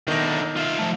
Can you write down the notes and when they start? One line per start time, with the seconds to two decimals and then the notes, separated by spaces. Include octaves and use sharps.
0.08 E2 D3 D#3 D#4 A#6
0.56 F4 E5
0.78 F3 A3